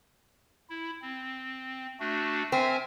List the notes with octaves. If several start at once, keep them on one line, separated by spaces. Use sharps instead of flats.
E4
C4
A3 D4 F#4
C4 E5 G#5 F6